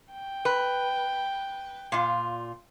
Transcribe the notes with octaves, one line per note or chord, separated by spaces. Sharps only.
G5
B4
A#2 F4